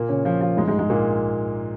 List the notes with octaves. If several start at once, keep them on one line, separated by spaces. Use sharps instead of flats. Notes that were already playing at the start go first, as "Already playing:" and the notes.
Already playing: A#2 A#3
C#3 C#4
F3 F4
F3 F4
G#2 G#3
G#2 G#3
G#2 G#3
A#2 A#3